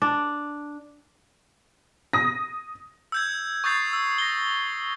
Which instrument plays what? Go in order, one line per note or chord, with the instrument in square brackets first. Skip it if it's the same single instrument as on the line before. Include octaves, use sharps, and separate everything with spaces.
[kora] D4
[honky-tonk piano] D#6 A#6
[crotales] E6 G6 G#6
C#6 D#6 G6 A6 C7
E6
A#6 G7